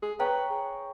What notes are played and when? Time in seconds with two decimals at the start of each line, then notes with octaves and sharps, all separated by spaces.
0.02 G#4
0.19 B4 C#5 G5 A#5
0.50 G#4